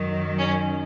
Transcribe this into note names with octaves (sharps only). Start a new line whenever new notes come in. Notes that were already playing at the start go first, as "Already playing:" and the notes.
Already playing: F#2 D#3 F#3
C#4